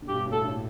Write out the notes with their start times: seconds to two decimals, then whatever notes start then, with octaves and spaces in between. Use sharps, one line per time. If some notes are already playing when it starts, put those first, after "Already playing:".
0.02 D3
0.09 G2 B2 G4
0.26 A2 D3
0.32 A4
0.43 A2 D3